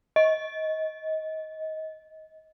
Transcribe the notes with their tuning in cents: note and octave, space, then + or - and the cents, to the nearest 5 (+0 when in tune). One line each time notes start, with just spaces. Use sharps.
D#5 +20